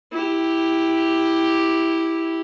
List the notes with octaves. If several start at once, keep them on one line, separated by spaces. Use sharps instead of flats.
E4 G4